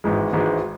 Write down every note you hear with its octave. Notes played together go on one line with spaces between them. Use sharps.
G#1 G#2 E3 G#3
G#1 G#2 E3 G#3